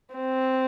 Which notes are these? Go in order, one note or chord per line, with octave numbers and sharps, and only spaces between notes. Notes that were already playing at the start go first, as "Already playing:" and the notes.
C4